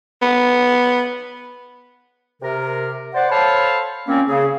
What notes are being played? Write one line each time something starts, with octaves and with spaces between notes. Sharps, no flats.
B3
C3 A#4
C5 D5 F#5
A4 C5 C#5 F5 A5 B5
A#2 A#3 C4 C#4
C#3 G#4